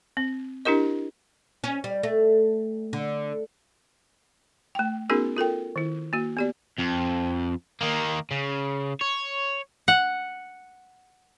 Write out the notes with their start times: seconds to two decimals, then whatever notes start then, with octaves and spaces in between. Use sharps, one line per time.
0.17 C4
0.65 D4 E4 G4 A#4 D#5
1.64 C#4
1.84 G3
2.03 A3
2.93 D3
4.75 A3 G5
5.10 B3 C#4 D#4 F#4 G#4 A#4
5.37 F4 A4 A#4 G5
5.76 D#3 E4
6.13 A#3 F#4
6.37 B3 G4 D5
6.78 F2
7.81 D#3 A#3
8.31 C#3
9.01 C#5
9.88 F#5